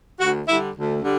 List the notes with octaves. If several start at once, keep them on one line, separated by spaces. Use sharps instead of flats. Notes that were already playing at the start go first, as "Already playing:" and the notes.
D2 F#4
D3 G3 E4
D2
D3 G3